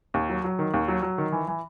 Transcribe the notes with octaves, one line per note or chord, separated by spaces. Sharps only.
D#2
F#3
F#3
D#3
D#2
F#3
F#3
D#3
E3
E3